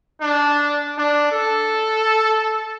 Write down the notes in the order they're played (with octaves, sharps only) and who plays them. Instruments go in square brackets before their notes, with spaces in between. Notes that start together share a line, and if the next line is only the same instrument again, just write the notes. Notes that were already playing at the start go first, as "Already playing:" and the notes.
[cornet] D4
D4
A4